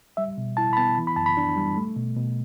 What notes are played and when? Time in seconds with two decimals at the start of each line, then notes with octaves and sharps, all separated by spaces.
0.17 G3 E5
0.38 B2
0.57 E4 A5
0.73 B5
0.77 B3 A5
0.98 E3
1.07 B5
1.16 F#2 A5
1.26 B5
1.37 D4
1.56 G3
1.77 A3
1.96 B2
2.17 B2